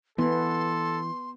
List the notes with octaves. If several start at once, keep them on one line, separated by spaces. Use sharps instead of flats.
E3 B3 A4 C6